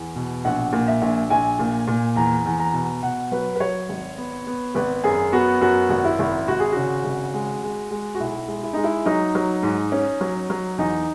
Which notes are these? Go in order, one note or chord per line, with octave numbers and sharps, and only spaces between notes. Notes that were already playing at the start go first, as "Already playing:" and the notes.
Already playing: E2
B2
A#1 F#5
A#2
E5
A#1
A#1 G#5
A#2
A#2
E2 A#5
E2
A#5
B2
B2 F#5
F#3 B4
B4
F#3 C#5
G#1
B3
B3
G#1 B4
F#2 G#4
B3 F#4
F#2 F#4
G#1
E4
G#1
G#1 F#4
G#4
C#3 F#4
G#1
G#3
G#3
G#3
F#4
B1 E4
G#3
E4
G#3 D#4
E4
F#3 D#4
F#3
G#2
C#4
F#3
F#3
E2 D#4